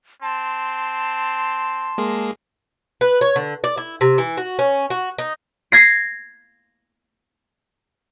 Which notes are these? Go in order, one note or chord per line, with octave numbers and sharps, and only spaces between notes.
C4 A5 C6
G#3 A#3 G#4
B4
C#5
D3
D5
E4
C3
E3
F#4
C#4
F#4
D#4
G#6 A#6 C7